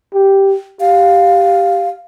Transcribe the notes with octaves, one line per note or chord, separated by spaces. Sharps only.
G4
G4 F5